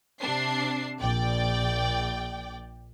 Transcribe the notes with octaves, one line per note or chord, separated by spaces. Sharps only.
C3 D4 C7
A#1 D5 G5